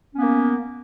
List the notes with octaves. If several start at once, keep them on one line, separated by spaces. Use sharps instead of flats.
A#3 B3 C#4